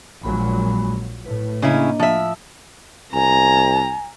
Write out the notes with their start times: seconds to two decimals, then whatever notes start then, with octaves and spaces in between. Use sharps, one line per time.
0.23 A#1 A#2 F#3 G#3 B5
1.25 A2 B4
1.62 C#3 A#3 C#4 D4 E4 D#5
1.99 F3 E5
3.14 C2 G#5 A#5